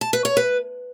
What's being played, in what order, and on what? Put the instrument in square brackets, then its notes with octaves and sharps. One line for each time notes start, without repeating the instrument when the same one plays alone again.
[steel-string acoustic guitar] A5
B4
C#5
B4